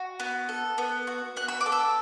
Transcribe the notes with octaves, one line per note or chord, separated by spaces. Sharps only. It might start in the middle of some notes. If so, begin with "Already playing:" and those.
Already playing: F#4
B3
A4
B3
F#4
B3 F#6
E6
D6
A4
E6